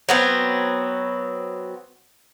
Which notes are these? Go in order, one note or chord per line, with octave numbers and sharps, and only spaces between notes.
F#3 B3 C4